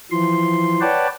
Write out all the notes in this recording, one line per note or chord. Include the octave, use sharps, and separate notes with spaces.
E3 F3 C6
B4 C#5 D5 F#5 G5 A5